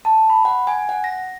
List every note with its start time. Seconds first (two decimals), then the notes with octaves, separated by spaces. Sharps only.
0.05 A5
0.30 B5
0.45 F#5
0.67 G#5
0.89 F#5
1.04 A#6